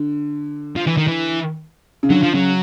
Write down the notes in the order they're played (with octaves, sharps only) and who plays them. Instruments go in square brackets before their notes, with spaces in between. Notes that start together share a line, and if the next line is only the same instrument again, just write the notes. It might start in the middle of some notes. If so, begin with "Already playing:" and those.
Already playing: [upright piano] D3
[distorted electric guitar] F3
E3
D#3
E3
[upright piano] C#3
[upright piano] D3 [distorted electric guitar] F#3
[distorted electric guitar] F3
[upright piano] C#3 [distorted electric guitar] F#3